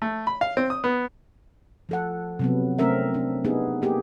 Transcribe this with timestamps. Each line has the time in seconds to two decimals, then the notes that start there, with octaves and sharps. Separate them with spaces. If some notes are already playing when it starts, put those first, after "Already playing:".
0.02 A3
0.27 B5
0.41 F5
0.57 C4
0.70 D#6
0.84 B3
1.89 F3 A4 F#5
2.39 C3 F#3 B3
2.79 A3 C4 C#4 A#4 E5
3.14 D4
3.44 B3 D4 D#4 G4 G#4
3.82 A#3 G4 G#4